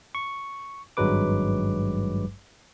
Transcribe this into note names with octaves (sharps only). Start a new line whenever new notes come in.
C#6
G#1 G2 F#3 G#3 B4 D6